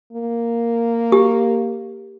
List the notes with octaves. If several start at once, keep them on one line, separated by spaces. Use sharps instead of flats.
A#3
G4